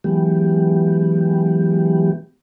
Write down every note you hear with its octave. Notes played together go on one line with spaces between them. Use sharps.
E3 F#3 G#3 B3 G4